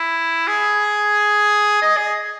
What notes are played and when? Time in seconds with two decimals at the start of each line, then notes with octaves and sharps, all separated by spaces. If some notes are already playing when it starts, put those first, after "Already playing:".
Already playing: E4
0.47 G#4
1.82 D#5
1.97 G#4